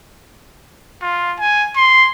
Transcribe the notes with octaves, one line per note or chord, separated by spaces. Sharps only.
F4
G#5
C6